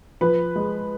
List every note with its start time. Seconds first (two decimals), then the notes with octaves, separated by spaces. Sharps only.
0.21 F3 B4
0.56 G#3